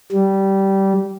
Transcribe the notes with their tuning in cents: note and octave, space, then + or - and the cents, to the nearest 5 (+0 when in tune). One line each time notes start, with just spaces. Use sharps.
G3 -15